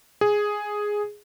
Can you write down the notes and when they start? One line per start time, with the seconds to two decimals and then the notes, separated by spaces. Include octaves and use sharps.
0.21 G#4